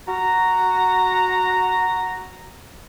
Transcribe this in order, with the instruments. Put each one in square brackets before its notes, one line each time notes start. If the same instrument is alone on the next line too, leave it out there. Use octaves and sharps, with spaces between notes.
[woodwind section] F#4 A#5